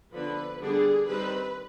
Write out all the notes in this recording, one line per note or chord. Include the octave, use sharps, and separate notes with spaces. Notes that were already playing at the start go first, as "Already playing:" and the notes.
D3 F3 B3 D4 B4
D3 G3 B3 D4 G#4
D#3 G3 C4 B4